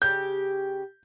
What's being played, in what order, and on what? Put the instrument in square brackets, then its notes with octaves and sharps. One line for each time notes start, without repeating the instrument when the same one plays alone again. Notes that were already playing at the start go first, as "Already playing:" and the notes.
[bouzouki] C#3 G4 [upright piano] G6